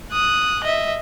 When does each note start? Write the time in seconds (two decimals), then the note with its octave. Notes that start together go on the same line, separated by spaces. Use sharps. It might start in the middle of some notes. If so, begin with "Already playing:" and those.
0.12 D#6 F#6
0.64 D#5 E5